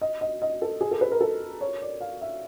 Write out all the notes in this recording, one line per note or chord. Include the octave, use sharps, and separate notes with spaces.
D#5
D#5
D#5
A4
G#4
A4
B4
A#4
A4
C#5
D5
F5
E5